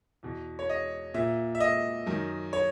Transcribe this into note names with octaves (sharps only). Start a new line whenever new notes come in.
E2 B2
C#5
D#5
A#2 E5
E5
D#5
F#2 D#3
C#5